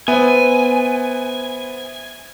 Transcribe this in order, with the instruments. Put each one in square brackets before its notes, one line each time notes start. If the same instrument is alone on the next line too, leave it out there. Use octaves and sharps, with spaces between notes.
[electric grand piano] B3 [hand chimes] C5 E5 [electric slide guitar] G#5